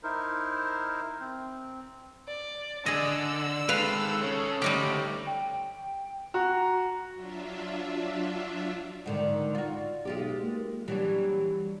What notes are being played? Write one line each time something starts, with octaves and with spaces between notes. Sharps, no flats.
D#4 E4 A#4 C5
C4
D5
D3 G#4 D5 D#5 E6
D#3 G#3 A4 B4 F5
C#3 C#5
D2 G3 D#4 G4
G5
F#4 A#5
F#3 D4 F4 E5
G#2 D3 D#3
F4 F#4
B1 G#3 F4 G4
A#3
E3 F#3 G3 D4